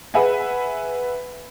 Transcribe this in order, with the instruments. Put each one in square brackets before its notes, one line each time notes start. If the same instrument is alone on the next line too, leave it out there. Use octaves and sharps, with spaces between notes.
[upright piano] G#4 B4 E5 F#5 G#5